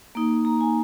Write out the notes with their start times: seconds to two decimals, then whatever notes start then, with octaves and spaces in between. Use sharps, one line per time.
0.15 A#3 D#4
0.45 A#5
0.61 G#5